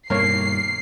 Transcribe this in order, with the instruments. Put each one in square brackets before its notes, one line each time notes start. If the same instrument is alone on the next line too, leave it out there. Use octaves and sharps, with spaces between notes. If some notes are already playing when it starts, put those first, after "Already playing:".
[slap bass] G2 B2 D#3 [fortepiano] A#3 C#5 [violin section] C7